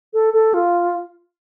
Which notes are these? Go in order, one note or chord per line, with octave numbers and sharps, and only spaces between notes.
A4
A4
F4